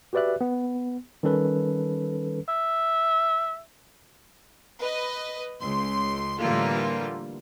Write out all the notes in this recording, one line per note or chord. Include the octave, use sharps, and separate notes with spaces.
F#4 G4 B4 D5 E5 F#6
B3
D#3 G3 C#4 A4 B4
E5
B4 D#5
C#2 C6
A2 D3 E3 G3 A#3 F4